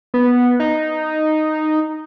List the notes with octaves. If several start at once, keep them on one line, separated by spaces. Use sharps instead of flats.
B3
D#4